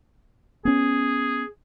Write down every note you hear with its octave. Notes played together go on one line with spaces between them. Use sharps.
B3 C#4 G#4